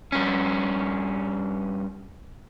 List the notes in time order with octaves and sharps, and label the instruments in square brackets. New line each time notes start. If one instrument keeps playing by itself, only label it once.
[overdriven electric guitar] G2 C#4